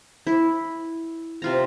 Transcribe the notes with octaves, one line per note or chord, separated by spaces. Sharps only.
E4
C3 F4 A#5